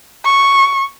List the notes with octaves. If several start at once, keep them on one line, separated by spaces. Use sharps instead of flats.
C#6